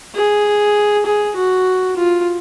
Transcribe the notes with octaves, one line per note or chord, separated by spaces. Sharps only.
G#4
G#4
F#4
F4